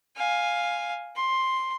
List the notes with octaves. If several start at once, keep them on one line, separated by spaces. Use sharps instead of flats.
F5 G#5
C6